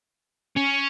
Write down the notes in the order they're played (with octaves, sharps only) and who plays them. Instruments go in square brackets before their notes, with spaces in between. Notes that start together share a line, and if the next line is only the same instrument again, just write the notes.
[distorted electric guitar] C#4